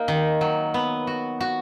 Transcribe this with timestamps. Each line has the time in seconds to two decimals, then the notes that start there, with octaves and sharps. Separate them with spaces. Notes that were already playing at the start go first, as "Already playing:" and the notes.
Already playing: A#3 D#4
0.08 D#3
0.41 F#3
0.74 B3
1.07 F#4
1.40 F#4